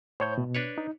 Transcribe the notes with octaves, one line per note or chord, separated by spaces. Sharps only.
A2 C5 C#5 G6
B2
D4 B4 C#5
D#4